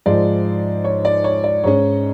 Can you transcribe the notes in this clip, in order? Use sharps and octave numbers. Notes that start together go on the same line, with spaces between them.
G#2 F3 G#3 D5
C#5
D5
C#5
D5
G#2 G#3 C#4 C#5